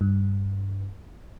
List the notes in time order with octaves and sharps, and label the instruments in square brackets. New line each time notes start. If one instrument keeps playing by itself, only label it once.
[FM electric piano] G2